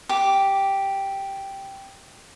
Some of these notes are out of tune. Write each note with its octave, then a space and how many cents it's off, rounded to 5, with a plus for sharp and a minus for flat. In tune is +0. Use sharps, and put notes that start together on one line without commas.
G4 +0 D6 -10